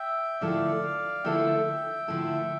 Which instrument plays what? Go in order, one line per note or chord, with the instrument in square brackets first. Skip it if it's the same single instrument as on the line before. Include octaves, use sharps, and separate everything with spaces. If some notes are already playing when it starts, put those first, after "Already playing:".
Already playing: [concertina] E5 G5
[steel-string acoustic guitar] D3 F3 A3 E4 A4 [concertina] D5 F5
[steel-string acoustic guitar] D3 F3 A3 E4 A4 [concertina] E5 G5
[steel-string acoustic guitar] D3 F3 A3 E4 A4